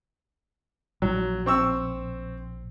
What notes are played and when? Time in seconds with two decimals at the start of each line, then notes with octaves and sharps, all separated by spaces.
1.02 A#1 F#3
1.46 C4 C#6 E6